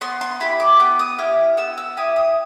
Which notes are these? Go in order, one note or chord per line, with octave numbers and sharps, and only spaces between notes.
B3 C6
C6
E4 G4 B5
D6
B3 D6
D#6
E4 G4 F6
B3 E6
E6
E4 G4 D#6
D#6